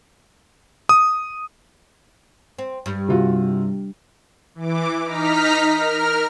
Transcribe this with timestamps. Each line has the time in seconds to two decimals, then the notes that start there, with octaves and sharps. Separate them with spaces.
0.89 D#6
2.58 C4
2.86 G2
3.09 C3 F4 F#4
4.55 E3 D6
5.04 D#4 A#5 F6 B6
5.76 A#4 F6